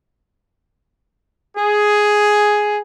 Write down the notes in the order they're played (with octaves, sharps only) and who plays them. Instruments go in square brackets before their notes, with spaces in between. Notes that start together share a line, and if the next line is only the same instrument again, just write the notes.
[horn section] G#4